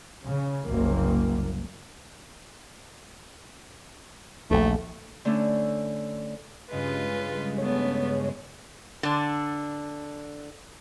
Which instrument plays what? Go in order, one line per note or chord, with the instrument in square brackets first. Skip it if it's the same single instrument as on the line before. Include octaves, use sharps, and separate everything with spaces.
[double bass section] C#3
F#1 C2 A#3
[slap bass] A#1 D#2 [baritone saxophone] A3
[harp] D3 A3 C#4 D4 E4
[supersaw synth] G2 C#3 G#3 [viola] F4 B4
[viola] A3 B3 [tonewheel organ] C#5
[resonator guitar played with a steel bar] D3 D4